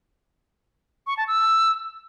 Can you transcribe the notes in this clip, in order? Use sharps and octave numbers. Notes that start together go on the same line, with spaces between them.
C#6
A5
E6